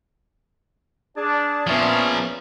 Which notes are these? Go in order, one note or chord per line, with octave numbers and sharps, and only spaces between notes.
D4 G#4 D5 A5
A#2 F3 B3 C#4 E5 G7